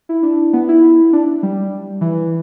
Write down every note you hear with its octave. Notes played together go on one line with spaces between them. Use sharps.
E4
D4
B3
E4
D4
G3
E3